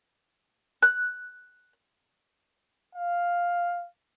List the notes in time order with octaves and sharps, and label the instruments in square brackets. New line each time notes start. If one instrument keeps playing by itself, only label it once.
[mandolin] F#6
[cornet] F5